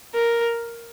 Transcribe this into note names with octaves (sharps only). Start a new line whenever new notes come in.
A#4